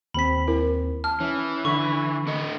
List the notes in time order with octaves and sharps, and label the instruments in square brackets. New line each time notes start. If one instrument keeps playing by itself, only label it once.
[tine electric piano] D#2 C4 [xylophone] B5 B6
[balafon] E4 A#4
[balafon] A5 [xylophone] F6
[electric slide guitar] E3 [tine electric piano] C#4
[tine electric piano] D3 B5 [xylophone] C#6
[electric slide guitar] D4 A4 D#5